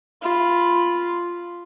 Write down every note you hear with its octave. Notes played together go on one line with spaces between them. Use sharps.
F4 B5